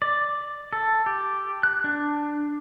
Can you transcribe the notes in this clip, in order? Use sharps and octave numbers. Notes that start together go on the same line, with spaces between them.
D5
A4
G4
F#6
D4